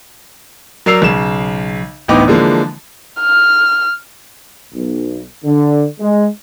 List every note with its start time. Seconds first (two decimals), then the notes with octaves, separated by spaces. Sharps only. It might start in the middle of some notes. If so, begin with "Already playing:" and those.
0.86 F#3 A#4 D5 E6 C7 F7
1.02 B1 C#3 E7
2.08 A1 D2 B3 D#4 G5 D6
2.28 D3 E3 F3 G#3 A#3
3.21 F6
4.74 B1
5.45 D3
6.00 G#3